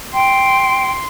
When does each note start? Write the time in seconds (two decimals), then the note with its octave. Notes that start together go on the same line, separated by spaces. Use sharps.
0.13 G5 C6